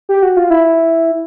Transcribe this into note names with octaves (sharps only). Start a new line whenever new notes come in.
G4
F#4
F4
E4